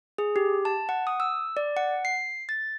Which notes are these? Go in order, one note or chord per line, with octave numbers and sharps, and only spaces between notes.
G#4
G4
A5
F#5
D#6
E6
D5
F#5
C7
A6